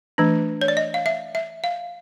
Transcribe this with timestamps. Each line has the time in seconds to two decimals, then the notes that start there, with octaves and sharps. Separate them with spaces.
0.18 E3 A3 D4
0.61 C#5
0.68 D5
0.77 D#5
0.94 F5
1.06 E5
1.35 E5
1.64 F5